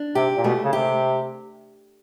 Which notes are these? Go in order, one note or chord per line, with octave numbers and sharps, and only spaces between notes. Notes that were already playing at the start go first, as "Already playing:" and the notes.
Already playing: D4
C3 G4
A#2
B2 A3
C#3
C3 G4